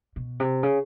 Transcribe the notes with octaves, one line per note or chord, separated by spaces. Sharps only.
B2
C3
C#3